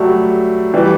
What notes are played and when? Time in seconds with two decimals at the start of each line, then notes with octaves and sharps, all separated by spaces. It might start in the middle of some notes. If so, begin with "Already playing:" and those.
Already playing: F#3 G3 A3
0.74 E3 G3